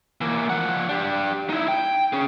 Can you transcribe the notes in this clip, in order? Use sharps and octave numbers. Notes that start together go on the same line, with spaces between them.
E3 A#3
F3 F#5
D4 G4
D#4 E4
G5
C#4 G#4